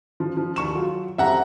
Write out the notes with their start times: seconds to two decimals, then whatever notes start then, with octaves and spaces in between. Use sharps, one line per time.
0.20 F3
0.37 F3
0.56 D#2 C#6 E7
0.75 F#3 F4
1.18 F2 G3 E5 F#5 A#5